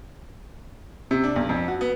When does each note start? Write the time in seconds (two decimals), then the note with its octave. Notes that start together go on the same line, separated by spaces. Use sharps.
1.11 C3
1.24 D4
1.36 B1
1.49 F2
1.68 F#4
1.81 B3